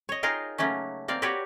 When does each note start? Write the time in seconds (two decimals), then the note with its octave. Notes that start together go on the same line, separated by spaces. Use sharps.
0.09 C#5 D#5
0.23 D#4 F4 G#4 A#4 F5 G5
0.58 C#3 F#3 A3 A#3 C#4
1.08 A#3 C4 D5 F5
1.22 F#4 G4 A#4 B4 C#5 D5